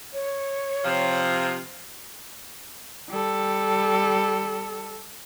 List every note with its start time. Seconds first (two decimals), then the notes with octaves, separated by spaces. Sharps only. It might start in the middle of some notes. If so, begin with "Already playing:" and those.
0.13 C#5
0.85 C3 F3
3.10 G3 A4